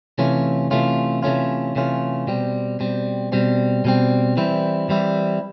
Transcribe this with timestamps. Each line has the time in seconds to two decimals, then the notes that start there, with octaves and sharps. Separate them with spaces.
0.18 C3 E3 A3 C#4 F4
0.71 C3 E3 A3 C#4 F4
1.23 C3 E3 A3 C#4 F4
1.76 C3 E3 A3 C#4 F4
2.27 B2 G3 C4
2.80 B2 G3 C4
3.32 B2 G3 C4
3.85 B2 G3 C4
4.37 E3 G3 C4 E4
4.89 E3 G3 C4 E4